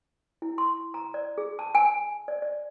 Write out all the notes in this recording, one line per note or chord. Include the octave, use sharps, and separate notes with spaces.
E4
C6
A#5
D5
G#4
A5
G#5
D5
D5